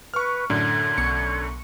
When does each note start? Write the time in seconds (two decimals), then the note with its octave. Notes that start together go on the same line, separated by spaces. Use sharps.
0.14 B4 C#6 F6
0.50 F#2 A2 D3 G#6
0.97 B1 C#6 C#7